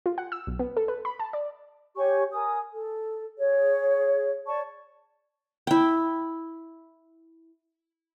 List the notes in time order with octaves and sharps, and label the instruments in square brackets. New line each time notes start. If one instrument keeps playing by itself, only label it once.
[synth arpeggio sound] F4
F#5
E6
B1
B3
A4
B4
B5
A5
D5
[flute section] G4 C#5 G#5 C#6
A#4 G#5 D#6
A4
G#4 C#5
C#5 D5 A5 C#6
[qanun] E4 G5